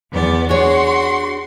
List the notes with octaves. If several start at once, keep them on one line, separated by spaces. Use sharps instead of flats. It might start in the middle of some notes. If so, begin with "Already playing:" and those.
E2 B3 D5
D4 F#4 G#4 C#5 C6